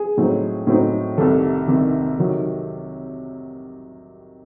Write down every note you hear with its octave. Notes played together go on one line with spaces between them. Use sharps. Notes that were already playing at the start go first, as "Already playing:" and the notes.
Already playing: G#4
A2 F#3 C4 D#4
A2 F#3 C4 D#4
C2 C3 D#3 A4
C2 C3 D#3
C3 D#3 F#3